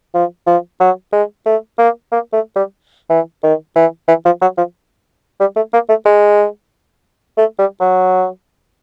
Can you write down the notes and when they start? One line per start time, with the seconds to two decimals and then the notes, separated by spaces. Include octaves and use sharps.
0.15 F3
0.47 F3
0.81 F#3
1.13 G#3
1.46 A3
1.79 A#3
2.12 A#3
2.33 A3
2.56 G3
3.10 E3
3.43 D#3
3.76 E3
4.08 E3
4.25 F3
4.42 F#3
4.58 F3
5.40 G3
5.56 A3
5.73 A#3
5.89 A3
6.05 G#3
7.38 A3
7.59 G3
7.81 F#3